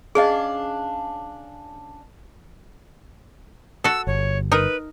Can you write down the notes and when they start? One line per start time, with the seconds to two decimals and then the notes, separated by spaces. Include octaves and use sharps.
0.15 C#4 D4 G#4 D#5 F5
3.84 F#4 A4 E6
4.07 G1 C#5
4.52 D#4 A#4 B4